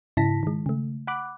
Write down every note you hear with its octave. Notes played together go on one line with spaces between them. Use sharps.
G#2 C#3 E4 A5 A#6 B6
D#3 G#3
C#3 A3
F#5 B5 D6 F#6